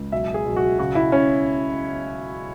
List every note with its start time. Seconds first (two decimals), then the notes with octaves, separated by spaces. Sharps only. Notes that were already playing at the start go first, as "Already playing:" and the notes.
Already playing: C#2
0.12 B1 E5
0.34 G#4
0.46 B1
0.56 F#4
0.79 C#3 F#4
0.95 E4
1.12 C#4